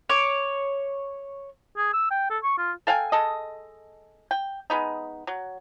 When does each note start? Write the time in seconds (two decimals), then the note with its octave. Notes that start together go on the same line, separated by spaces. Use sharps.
0.09 C#5 D6
1.77 G#4
1.93 E6
2.11 G5
2.30 A4
2.43 C#6
2.58 F4
2.87 A4 F5 G5 G#5
3.12 G#3 A4 D#5
4.31 G5
4.70 G#3 B3 D#4
5.27 F#3